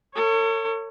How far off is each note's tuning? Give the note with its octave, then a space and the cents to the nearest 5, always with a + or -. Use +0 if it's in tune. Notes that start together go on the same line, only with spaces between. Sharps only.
A4 +45 C#5 +0